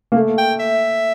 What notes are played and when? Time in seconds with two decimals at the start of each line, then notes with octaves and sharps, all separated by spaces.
0.12 A#3
0.16 A3
0.38 G5
0.59 E5